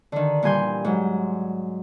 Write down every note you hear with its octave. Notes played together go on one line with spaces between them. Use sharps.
D3 D#3
A#2 E3 G3 G#5 C6 G6
G#2 F#3